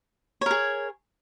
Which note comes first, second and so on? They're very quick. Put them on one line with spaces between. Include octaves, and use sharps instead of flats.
C#5 A#4 G#4